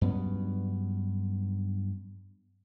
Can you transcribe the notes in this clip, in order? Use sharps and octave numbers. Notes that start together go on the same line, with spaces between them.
G2 F#3 B3 C#4